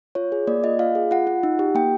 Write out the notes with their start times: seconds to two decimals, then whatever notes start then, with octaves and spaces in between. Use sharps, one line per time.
0.15 F4 C#5
0.32 G#4
0.47 A#3 D5
0.63 F4 D#5
0.79 F4 F5
0.95 G#4
1.11 F4 F#5
1.27 F4
1.43 D#4
1.59 G4
1.75 A#3 G5